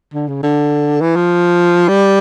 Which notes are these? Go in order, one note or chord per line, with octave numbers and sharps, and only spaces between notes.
D3
C#3
D3
E3
F3
G3